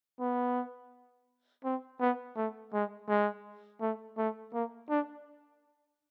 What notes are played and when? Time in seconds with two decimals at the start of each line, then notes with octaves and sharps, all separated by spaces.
0.20 B3
1.64 C4
2.00 B3
2.36 A3
2.73 G#3
3.09 G#3
3.81 A3
4.17 A3
4.53 A#3
4.90 D4